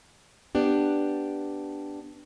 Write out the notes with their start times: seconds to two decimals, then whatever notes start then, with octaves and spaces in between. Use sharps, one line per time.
0.55 B3 D4 G4